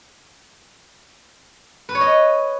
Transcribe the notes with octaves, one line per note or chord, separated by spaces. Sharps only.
B4
C#5
D#5